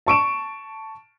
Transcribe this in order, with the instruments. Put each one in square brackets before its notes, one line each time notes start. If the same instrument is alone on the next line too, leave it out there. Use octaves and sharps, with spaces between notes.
[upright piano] A5 C#6 D7 E7